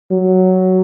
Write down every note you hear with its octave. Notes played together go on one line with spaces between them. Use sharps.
F#3